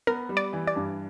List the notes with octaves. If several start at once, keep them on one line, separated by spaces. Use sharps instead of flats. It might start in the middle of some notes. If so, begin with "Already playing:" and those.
B3 A#4
G3
D5
E3
D5
G2